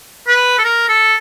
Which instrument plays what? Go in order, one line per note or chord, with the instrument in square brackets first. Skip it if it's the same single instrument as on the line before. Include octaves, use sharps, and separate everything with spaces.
[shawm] B4
A4
A#4
A4